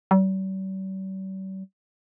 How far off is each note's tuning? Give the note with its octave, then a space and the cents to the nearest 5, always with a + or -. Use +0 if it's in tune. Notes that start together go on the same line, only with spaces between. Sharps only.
G3 -45